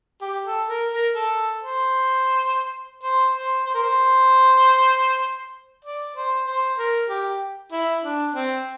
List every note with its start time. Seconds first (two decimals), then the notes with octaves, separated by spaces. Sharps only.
0.22 G4
0.45 A4
0.69 A#4
0.92 A#4
1.15 A4
1.62 C5
3.03 C5
3.35 C5
3.66 C5
3.74 A#4
3.83 C5
5.85 D5
6.16 C5
6.47 C5
6.78 A#4
7.10 G4
7.72 E4
8.04 D4
8.35 C4